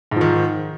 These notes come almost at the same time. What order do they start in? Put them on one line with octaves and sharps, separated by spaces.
G#2 F3 D#3